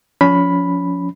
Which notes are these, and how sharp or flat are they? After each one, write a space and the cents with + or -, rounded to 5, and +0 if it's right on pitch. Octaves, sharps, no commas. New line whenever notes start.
F3 +20 C#4 +30 B5 +0